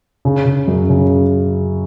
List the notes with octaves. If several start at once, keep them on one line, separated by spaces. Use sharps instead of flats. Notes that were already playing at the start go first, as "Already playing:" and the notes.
C#3
C#3
F#2
C#3